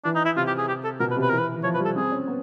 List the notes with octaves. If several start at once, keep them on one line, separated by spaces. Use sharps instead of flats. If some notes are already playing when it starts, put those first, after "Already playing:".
E3 D4
D#4
E4
C3 F4
G4
G#4
G4
A4
B2 A#4
B4
C3
B4
E3 A#4
B4
E3
F3 C#5
B4
G3
A4
C4 G#4
C#4
B3